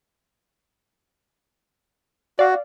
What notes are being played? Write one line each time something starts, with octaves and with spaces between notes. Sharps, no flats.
F#4 D5 F5